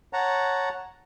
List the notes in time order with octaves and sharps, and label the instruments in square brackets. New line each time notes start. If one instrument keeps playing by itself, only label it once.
[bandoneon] C#5 F#5 A5 A#5